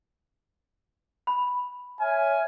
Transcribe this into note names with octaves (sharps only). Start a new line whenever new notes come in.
B5
C#5 E5 G#5 F6